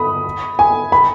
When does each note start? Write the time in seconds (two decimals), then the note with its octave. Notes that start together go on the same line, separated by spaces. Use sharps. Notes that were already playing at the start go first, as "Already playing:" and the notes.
Already playing: B5 D#6
0.59 G#5
0.92 B5